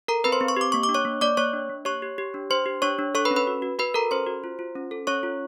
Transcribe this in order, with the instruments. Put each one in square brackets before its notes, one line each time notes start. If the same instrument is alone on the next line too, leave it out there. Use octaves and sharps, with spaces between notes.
[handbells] A4 A#4 A#5
C4 B4 B5
C5 C6
C4
C#6
G4 D6
A#3 C#6
D6
D4
C#5 C#6
A#3
A#3 D5 D6
A#3 C#5 C#6
D4
A#3
G4 C#5 C#6
G4
G4
D4
D4 C5 C6
G4
D4 C#5 C#6
D4
A4 C#5 C#6
B4 B5
C#4
B4 B5
F#4
F#4
F#4 B4 B5
A4 A#4 A#5
C#4 C5 C6
F#4
F4
F4
C#4
A4
C#4 C#5 C#6
F4